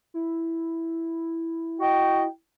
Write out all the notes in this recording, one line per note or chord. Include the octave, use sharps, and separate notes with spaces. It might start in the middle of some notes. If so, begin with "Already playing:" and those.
E4
F#4 D#5 G5